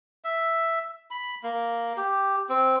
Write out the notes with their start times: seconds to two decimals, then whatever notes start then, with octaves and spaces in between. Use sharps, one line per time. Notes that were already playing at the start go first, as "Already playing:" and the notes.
0.24 E5
1.11 B5
1.43 A#3
1.97 G4
2.49 C4